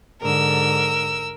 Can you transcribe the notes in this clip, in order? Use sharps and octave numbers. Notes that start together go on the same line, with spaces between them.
G#2 D3 A#4 E6